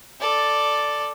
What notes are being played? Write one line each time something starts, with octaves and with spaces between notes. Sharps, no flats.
A4 D5